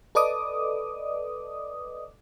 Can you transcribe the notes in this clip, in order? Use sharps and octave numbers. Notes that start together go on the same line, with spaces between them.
A4 B4 D5 D#5 D6 D#6